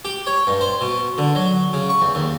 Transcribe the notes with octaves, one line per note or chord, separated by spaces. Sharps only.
G4
C#5
G2
C5
B2
D3
F#3
C#3
C#6
E2
D#2